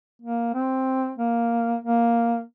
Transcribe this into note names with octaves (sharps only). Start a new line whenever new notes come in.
A#3
C4
A#3
A#3